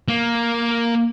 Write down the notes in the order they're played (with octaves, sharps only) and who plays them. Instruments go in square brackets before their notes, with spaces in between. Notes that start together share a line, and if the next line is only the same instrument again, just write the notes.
[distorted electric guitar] A#3